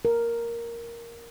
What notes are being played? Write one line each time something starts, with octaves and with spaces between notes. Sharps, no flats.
A#4